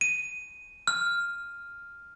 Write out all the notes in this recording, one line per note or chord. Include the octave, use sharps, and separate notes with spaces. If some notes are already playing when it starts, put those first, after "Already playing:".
D#7
F6